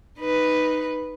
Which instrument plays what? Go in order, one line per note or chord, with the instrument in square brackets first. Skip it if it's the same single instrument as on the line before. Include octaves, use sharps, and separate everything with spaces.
[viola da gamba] D#4 B4